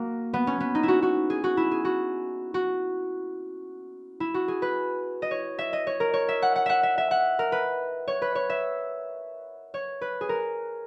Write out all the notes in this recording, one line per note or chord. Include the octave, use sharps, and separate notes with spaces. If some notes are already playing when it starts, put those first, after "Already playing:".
Already playing: A#3 F#4
B3
C#4
B3
D#4
E4
F#4
F#4
G#4
F#4
E4
G#4
F#4
F#4
E4
F#4
G#4
B4
D#5
C#5
E5
D#5
C#5
A#4
C#5
E5
F#5
F#5
E5 F#5
E5
E5
F#5
A#4
B4
C#5
B4
C#5
E5
C#5
B4
G#4
A#4